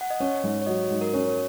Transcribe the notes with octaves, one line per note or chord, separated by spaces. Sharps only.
F#5
D#5
C#4 C#5
G#2
C#5
F#3 D#5
G#2
A#4
C#4 C#5
C#5